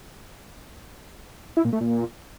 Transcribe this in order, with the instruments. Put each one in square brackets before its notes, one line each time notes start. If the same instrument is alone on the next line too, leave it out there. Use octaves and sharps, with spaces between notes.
[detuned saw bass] E4
A#2
A3
A#2